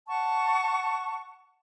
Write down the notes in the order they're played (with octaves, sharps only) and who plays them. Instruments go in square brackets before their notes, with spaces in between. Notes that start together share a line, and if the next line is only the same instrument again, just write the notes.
[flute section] F#5 A5 C#6